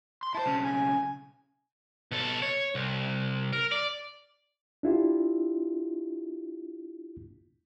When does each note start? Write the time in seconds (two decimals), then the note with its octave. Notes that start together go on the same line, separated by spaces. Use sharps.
0.23 C6
0.35 E4 C5 A5
0.46 B1 C#3
0.64 G#5
2.11 B2 A4
2.42 C#5
2.75 C2
3.53 A#4
3.72 D5
4.83 D4 E4 F4 G4